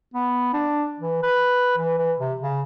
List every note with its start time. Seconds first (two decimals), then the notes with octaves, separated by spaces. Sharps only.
0.14 B3
0.53 D4
0.99 E3
1.23 B4
1.77 E3
1.98 E3
2.19 C3
2.41 C#3